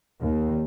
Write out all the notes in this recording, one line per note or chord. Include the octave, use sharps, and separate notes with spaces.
D#2